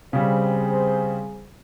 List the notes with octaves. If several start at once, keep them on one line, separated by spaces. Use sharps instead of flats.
C#3 G3 C4 G#4 C5